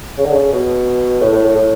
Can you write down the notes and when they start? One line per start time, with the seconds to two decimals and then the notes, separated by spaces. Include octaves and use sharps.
0.18 C#3
0.25 D3
0.33 C#3
0.52 B2
1.21 A2
1.33 A2
1.44 A2
1.56 A2